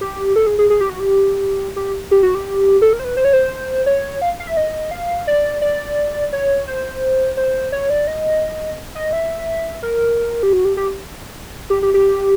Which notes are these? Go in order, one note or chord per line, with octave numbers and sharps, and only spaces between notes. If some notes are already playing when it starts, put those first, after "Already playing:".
G4
A4
G#4
G#4
G#4
G4
F#4
G4
G4
G4
F#4
G4
A4
A#4
C5
B4
C5
C#5
C5
C#5
F5
F5
E5
D#5
F5
D5
D5
C#5
C5
C5
C#5
D5
D#5
D#5
E5
A#4
G4
F#4
G4
G4
G4
G4
G4